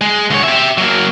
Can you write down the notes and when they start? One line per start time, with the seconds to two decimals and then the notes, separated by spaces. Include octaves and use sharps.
0.01 G#3
0.30 D2 C#5
0.44 G4 E5
0.78 F#3 A#3